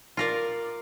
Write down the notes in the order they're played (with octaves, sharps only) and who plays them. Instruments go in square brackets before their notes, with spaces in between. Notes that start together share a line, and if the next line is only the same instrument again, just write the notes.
[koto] F4 A#4 D5